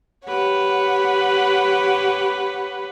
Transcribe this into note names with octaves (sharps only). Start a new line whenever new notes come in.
G4 B4 C#5 F#5